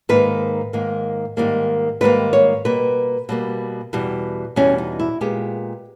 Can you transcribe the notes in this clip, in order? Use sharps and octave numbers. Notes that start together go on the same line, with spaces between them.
G#2 D#3 A#3 B4
G#2 D#3 A#3
G#2 D#3 G3 A#3
G#2 D#3 G3 A#3 B4
C#5
B2 G3 A#3 B4
B2 G3 A#3
E2 B2 G3
E2 B2 G3 C#4
D#4
E4
A#2 G#3 B3 G4